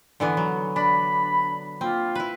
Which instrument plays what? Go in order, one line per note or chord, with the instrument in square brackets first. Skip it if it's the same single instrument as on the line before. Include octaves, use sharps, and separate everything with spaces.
[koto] D3 E3 B3
F#3
[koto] D4 [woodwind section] B5
[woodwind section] A#3 F4 [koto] C4
[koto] E4 B4